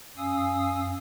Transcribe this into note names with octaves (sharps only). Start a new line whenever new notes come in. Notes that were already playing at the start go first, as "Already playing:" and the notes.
F#2 C#4 F5 G#5 D#6 E6